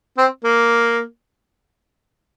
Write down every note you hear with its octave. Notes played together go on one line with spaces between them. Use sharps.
C4
A#3